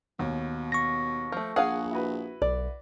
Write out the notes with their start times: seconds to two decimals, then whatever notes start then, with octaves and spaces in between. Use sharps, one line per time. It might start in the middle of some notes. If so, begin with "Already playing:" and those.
0.19 D#2 B2
0.72 C#6 A#6
1.32 F3 A3
1.56 A#1 G#4 F5 F#5 G#5
1.91 E4 F#4 B4
2.42 B1 D5